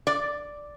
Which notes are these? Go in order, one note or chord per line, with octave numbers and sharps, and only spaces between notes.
D5